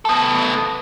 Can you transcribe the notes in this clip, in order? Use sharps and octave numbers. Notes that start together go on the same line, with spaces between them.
B3 A4